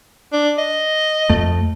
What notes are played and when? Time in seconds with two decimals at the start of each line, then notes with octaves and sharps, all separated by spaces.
0.33 D4
0.58 D#5
1.29 F2 A3